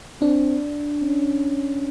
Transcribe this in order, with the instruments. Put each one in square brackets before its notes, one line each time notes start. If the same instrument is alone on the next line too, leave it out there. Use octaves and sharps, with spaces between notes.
[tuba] C4 [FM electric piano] D4
[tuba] C#4